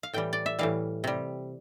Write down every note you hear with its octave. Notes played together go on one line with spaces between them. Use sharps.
F5
A2 E3 G3 G5
D5
E5
A2 E3 G3 F5
C3 G3